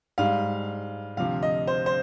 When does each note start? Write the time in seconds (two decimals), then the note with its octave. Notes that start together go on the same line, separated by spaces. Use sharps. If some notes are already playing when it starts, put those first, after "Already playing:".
0.18 G#2 G3 F5
1.17 D2 C3 F3 F5
1.43 D#5
1.67 C5
1.86 C5